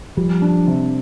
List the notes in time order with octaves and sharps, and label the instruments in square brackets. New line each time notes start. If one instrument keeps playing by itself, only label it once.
[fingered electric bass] F3 [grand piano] G3
[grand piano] D4
C3